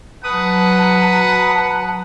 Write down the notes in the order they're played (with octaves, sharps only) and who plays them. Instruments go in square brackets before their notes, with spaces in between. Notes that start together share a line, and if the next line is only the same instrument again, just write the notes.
[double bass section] F#3 [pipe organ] B4 D#6 [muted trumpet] F#5 [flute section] A5 A#5